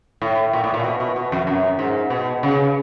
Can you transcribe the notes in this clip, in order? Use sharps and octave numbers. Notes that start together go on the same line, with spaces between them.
A2
A#2
A2
A#2
B2
B2
B2
F2
F#2
G#2
B2
C#3